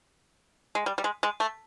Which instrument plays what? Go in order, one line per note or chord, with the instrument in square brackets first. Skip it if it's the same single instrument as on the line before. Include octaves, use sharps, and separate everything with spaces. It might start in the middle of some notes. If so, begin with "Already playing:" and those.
[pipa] G#3
G3
G3
G#3
G#3
A3